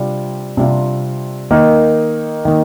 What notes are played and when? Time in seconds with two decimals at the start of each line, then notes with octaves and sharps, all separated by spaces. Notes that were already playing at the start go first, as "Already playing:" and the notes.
Already playing: C3 G3 D4 F4
0.57 C3 G3 D4 F4
1.51 D#3 A#3 D#4 A#4
2.45 D#3 A#3 D#4